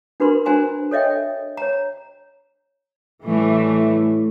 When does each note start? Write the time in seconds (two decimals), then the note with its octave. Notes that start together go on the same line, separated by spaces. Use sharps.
0.20 D4 F#4 A#4 B4 B5 C6
0.45 D4 F#4 C5 G#5 A#5 C6
0.91 A4 C#5 D#5 E5 G5
1.57 C#5 A#5
3.26 A2 E3 G3 A3